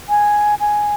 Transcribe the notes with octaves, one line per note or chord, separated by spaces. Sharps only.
G#5
G#5